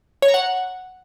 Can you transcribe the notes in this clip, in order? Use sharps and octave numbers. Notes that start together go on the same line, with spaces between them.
C#5
A#5
F#5